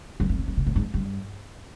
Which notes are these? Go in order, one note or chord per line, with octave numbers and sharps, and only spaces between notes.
F#2
F2
E2
F2
B2
A2
G#2
G2